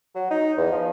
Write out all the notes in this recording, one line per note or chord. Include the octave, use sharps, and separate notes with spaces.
F#3
D#4
E2
F3